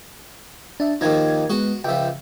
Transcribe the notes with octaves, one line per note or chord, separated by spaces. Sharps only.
D4 E5
D#2 D#3 F3 D#4 G#6
G#3 B3 F#4
C#2 F3 E5 G5